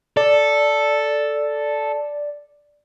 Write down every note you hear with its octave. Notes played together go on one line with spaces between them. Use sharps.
A4 D5